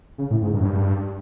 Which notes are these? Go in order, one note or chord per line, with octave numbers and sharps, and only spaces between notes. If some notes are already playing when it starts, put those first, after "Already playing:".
C#3
A2
G#2
G2
F#2
G2